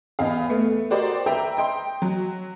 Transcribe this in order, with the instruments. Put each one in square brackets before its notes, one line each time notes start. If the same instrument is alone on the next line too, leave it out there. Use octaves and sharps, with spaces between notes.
[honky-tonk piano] E2 D#5 F5
A3 B3
F#4 G4 A#4 C5 D5 D#5
B4 E5 G5 A#5
D#5 G5 C6
F#3